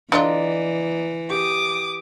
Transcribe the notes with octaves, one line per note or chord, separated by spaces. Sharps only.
D3 E3 D4 F4 D5 D#5 A#5
G4 D6 D#6